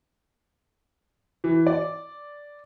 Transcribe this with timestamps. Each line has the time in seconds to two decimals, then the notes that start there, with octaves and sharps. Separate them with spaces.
1.44 E3
1.67 D5